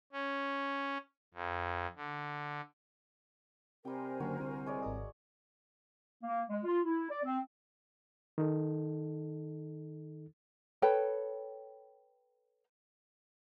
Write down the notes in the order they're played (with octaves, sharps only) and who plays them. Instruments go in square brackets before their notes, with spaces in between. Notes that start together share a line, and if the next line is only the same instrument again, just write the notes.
[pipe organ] C#4
F2
D3
[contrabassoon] C3 [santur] G3 G5 [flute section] A#4 C5 G#5
[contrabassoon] F#1 [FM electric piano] D3 [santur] F#4
[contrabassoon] C2
[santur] G#3 C#5 D5
[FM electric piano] G#1 A#4 D#5
[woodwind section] A#3
G#3
F4
E4
D5
C4
[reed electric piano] D#3 D#4 A4
[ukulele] A4 B4 C#5 G5